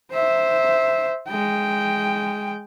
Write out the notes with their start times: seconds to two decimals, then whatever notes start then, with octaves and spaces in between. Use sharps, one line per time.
0.12 C5 E5
1.28 G#3 G5